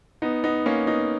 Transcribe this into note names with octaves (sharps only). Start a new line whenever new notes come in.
B3 D#4
B3 D#4
A#3 C#4
B3 D#4